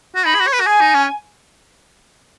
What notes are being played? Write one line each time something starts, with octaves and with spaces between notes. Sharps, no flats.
F#4
D#4 B5
G#4
F#4
C#5
B4
F#4
G#4 G#5
D#4
C#4